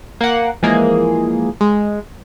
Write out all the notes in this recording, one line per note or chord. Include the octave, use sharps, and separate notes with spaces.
A#3 F#5
E3 F3 G#3 A#3 G#4
G#3